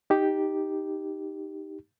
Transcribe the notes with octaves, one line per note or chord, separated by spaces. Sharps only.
D#4 G4